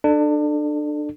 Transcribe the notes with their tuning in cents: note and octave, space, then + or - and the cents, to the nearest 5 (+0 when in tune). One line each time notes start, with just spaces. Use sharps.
D4 +25 A4 +0